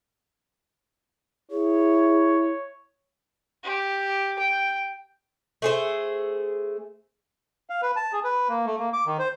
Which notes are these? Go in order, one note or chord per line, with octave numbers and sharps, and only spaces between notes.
E4 G#4 C#5
G4
G5
A3 G#4 C5
F5
B4
A5
G#4
B4
A#3
A3
A#3
D6
D#3
C5